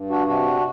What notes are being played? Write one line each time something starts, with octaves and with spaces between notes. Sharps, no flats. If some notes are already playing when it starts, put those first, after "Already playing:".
Already playing: G2
D4 F#4
C3 D4 F#4